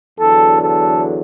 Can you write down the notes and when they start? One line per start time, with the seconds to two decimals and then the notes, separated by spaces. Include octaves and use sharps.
0.19 E2 D3 F#3 A4
0.60 A4